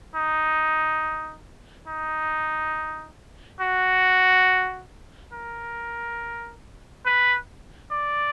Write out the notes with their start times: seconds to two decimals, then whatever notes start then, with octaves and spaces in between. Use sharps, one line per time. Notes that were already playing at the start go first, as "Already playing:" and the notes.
0.15 D#4
1.87 D#4
3.60 F#4
5.32 A#4
7.06 B4
7.91 D5